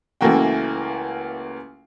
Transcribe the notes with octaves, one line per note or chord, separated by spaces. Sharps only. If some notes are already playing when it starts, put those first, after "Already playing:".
C#2 E3 A3 A#3 F#4 G5